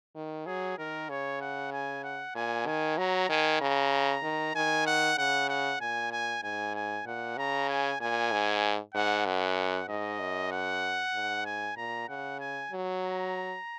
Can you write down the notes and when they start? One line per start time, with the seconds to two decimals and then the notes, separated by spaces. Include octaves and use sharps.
0.16 D#3
0.47 F#3 G#4
0.78 D#3 A#4
1.09 C#3 C#5
1.41 F#5
1.72 G#5
2.04 F#5
2.35 A#2 G#5
2.67 D#3 G#5
2.98 F#3 A#5
3.29 D#3 G#5
3.61 C#3 A#5
4.23 D#3
4.55 D#3 G#5
4.86 F#5
5.18 C#3 F#5
5.49 F#5
5.81 A#2 G#5
6.12 G#5
6.43 G#2 G#5
6.75 G#5
7.06 A#2 F#5
7.37 C#3 A#5
7.69 G#5
8.01 A#2 G#5
8.32 G#2
8.94 G#2 F#5
9.26 F#2 F#5
9.89 G#2 D#5
10.20 F#2
10.52 F#5
11.14 G#2
11.46 G#5
11.77 A#2 A#5
12.09 C#3 F#5
12.40 G#5
12.71 F#3
13.03 A#5